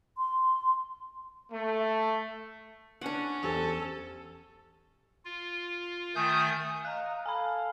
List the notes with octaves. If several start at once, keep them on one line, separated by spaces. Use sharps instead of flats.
C6
A3
C#4 D4 F#5
E2 G4 A4 C5
F4
D#3 A3 G#5 D#6 G6
D#5 F5 A#5 F#6
A4 F5 G#5 B5